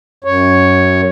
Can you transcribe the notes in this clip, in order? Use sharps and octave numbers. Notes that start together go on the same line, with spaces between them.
F#2 C#5